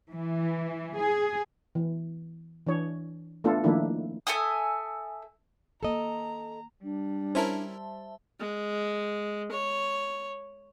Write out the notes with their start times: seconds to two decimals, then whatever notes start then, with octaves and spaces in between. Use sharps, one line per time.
0.12 E3
1.00 G#4
1.75 E3
2.67 E3 D4 C#5
3.44 A3 B3 D4 F4 A4
3.64 D#3 F3 A3 A#3 D4 E4
4.27 A4 E5 G#5 D#6
5.83 D#3 A#3 A4 D#5 A#5
6.84 G3 D4
7.35 C#4 E4 A#4 C5 E5 A5
8.40 G#3
9.51 C#5